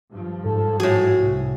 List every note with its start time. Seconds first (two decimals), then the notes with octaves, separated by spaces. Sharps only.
0.12 G2 F3
0.45 G#2 A4
0.80 A2 F#4 G#4
1.22 C2